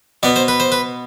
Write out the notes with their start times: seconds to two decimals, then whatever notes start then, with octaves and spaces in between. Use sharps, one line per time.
0.23 B2 B3 D5
0.36 C5
0.48 B4
0.60 C5
0.72 B4